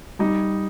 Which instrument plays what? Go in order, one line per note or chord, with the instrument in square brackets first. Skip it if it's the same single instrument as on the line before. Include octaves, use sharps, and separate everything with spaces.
[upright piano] G3 [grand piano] D#4